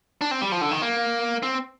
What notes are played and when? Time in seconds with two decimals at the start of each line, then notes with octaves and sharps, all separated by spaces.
0.21 D4
0.31 C4
0.41 G3
0.52 F3
0.61 D3
0.71 D#3
0.82 A#3
1.43 C4